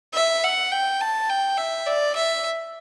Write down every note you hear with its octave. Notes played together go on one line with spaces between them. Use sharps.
E5
F#5
G5
A5
G5
E5
D5
E5